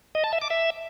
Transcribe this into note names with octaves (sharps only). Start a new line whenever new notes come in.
D#5
A5
E5
D6
E5